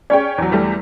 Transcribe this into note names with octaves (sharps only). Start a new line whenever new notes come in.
C#4 G#4 C#5 D5 G5
E2 F#3
E2 G3 A3